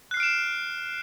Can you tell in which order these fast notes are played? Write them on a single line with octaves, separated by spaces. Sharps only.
F#6 C7 F6 D7 E7